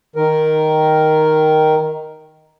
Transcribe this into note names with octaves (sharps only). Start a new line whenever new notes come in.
D#3 A#4